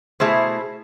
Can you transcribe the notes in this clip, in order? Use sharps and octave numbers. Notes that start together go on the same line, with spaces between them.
B2 A3 E4 G#4 C5